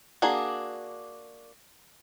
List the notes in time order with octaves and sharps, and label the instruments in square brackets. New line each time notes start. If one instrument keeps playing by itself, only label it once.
[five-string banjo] A#3 D4 F#4 G#4